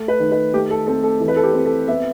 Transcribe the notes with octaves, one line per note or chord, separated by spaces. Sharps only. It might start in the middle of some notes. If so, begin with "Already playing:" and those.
Already playing: A3
B4
D#3
B4
A3 G4
A4
C4 A4
A4
E3 A4
B4
A4
G4
C4
A4
B3 E5